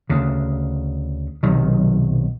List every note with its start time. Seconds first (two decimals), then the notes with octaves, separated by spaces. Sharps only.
0.10 D2 C#3
1.43 B1 C3 D#3 F#3